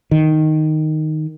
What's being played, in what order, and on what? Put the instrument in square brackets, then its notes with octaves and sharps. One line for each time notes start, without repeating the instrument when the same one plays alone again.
[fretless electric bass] D#3